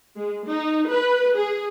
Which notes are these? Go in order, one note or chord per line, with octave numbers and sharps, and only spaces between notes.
G#3
D#4
B4
G#4